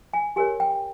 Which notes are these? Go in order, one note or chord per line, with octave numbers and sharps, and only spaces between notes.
G#5
G4 A#4 C#5 G#5
G5